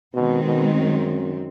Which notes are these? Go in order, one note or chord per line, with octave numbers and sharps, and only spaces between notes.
B2 D#3 G#3 C4
B2
F#2